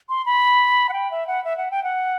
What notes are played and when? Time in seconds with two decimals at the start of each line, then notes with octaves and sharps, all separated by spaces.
0.09 C6
0.26 B5
0.89 F#5
0.93 G5
1.11 E5
1.27 F#5
1.44 E5
1.57 F#5
1.71 G5
1.84 F#5